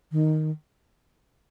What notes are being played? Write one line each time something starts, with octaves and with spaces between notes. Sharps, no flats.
D#3